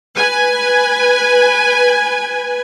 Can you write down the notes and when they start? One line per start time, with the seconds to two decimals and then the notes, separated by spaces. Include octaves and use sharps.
0.17 B4 G#5